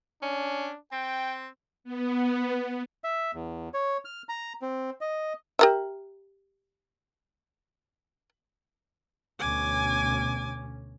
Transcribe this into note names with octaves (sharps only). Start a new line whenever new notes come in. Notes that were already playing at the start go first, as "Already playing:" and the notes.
C#4 D4
C4 G5
B3
E5
E2
C#5
F6
A#5
C4
D#5
G4 A#4 E5
D2 B2 C#4 G#5 D6